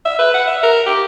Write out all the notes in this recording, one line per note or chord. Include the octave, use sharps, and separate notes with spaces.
E5
B4
F#5
E5
A#4
G4